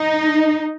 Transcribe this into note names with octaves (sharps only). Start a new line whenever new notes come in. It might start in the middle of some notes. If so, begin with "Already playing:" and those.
Already playing: D#4